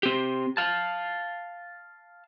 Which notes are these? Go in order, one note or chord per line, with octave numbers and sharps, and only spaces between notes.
C4 G4
F5 A5